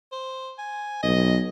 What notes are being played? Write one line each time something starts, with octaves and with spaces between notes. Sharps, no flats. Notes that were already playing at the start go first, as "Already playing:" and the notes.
C5
G#5
B1 D#5